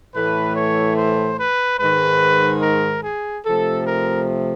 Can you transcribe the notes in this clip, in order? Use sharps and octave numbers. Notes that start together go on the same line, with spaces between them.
A2 E3 A3 B4
C#5
C5
B4
G#2 D#3 G#3 B4
A#4
G#4
C3 F3 A3 A4
A#4